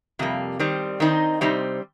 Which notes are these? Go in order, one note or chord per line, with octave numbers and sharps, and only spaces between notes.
F2 C3 G3 A#3
D#3 G3 C4
D#3 C4 D#4
C3 G3 C4 D#4